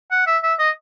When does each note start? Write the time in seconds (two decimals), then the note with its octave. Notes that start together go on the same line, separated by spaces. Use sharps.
0.11 F#5
0.27 E5
0.43 E5
0.59 D#5